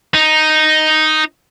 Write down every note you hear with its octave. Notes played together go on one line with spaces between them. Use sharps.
D#4